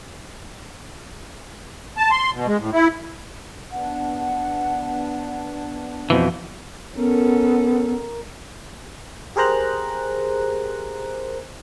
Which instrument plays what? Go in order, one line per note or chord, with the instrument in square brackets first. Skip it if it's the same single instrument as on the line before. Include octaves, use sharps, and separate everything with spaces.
[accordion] A5
C6
B2
G#3
A2
E4
[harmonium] B3 D4 [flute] F#5
[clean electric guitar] F2 B2 E3 [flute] C5
[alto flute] B3 [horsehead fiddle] C#4 A4 [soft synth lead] A#4
[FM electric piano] G4 G#4 A#4 C5 A#5 F#6